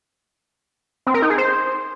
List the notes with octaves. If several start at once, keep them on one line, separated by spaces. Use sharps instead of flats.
C4
A#4
D#4
G#4
C5